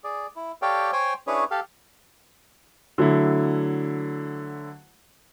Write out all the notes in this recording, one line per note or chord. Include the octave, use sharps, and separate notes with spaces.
G#4 D5
E4
G4 A4 C#5 D5 F5 G5
C5 C#5 G5 G#5
C#4 D4 E4 G#4 B4 C#5
G4 A4 F5
D3 F#3 A3 E4